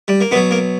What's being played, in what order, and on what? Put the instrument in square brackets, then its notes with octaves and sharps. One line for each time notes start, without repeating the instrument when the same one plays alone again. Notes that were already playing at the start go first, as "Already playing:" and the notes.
[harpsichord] G3
A#3
B2 F#3 B3
A#3